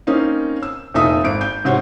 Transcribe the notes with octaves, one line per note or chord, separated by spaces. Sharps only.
A#3 C4 C#4 D#4
E6
F1 A#2 D#4 A4 E5 D#6
G#1 D7
G6
G#2 C3 F#4 C5 C#5